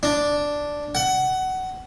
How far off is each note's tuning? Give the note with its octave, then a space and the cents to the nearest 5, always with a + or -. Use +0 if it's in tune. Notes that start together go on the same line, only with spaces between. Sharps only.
D4 +0
F#5 +20